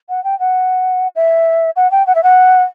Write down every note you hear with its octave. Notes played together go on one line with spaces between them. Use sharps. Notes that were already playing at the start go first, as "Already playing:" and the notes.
F#5
G5
F#5
E5
F#5
G5
F#5
E5
F#5